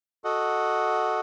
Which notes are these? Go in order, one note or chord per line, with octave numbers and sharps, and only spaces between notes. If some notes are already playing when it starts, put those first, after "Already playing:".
F#4 A4 D#5 F#5